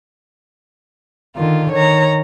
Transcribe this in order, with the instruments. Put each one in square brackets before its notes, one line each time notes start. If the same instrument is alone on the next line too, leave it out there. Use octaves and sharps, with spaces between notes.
[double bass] D3 D#3 [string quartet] F4
[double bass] D#3 [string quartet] C#5 A#5